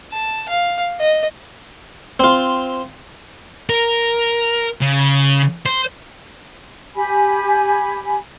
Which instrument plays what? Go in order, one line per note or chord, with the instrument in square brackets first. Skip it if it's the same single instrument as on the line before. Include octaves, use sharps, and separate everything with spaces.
[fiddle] A5
F5
D#5
[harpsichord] C4 F4
[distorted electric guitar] A#4
C#3
C5
[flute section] G4 G#5 B5